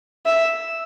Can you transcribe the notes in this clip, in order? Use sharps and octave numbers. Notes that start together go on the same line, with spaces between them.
E5